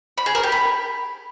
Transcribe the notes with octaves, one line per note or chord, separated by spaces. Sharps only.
B5
G#4
A#4
G4
B5